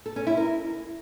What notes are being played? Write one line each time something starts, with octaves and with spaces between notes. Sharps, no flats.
A4
C#4
E4
A#4